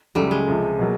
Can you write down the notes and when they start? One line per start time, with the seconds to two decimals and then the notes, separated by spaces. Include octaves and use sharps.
0.15 C#2 C#3 F#3 G3 A3
0.31 G#3
0.48 C#2 C3 F3
0.79 B2 F#3 A#3